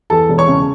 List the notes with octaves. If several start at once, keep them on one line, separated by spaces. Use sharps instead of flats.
E2 A4 A5
E1
C#5 C#6
C#3